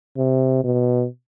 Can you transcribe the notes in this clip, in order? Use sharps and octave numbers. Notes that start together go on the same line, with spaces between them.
C3
B2